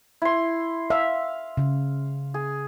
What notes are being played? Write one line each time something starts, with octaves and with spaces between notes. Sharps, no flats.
E4 C6
E5 F5
C#3
G#4